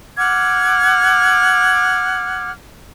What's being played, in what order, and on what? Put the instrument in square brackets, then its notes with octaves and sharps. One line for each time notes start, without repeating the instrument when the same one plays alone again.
[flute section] F#5 D6 F6 G#6